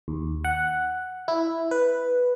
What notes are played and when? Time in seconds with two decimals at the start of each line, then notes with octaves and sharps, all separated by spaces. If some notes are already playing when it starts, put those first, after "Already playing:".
0.08 D#2
0.44 F#5
1.28 E4
1.71 B4